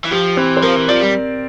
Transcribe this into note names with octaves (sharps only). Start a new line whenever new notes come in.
E3
F3 G4
E3 C4
C5
F3 A#4
E3
F3 D5
G3